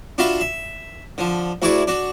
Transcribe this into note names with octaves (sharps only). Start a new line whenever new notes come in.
D4 F4 F#4 E5 F5 B5
E5
D3 F3
D2 E4 F#4 G#4 D5 C#6
D4 F#4